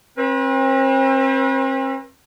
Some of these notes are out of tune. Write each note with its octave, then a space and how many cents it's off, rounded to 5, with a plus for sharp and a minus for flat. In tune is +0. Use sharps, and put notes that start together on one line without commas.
C4 +40 B4 -30